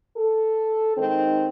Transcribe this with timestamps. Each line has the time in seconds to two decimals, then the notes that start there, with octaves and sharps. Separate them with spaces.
0.17 A4
0.97 D#3 G#3 C4 D#4